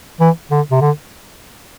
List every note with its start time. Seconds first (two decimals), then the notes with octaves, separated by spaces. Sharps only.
0.20 E3
0.51 D3
0.71 C3
0.81 D3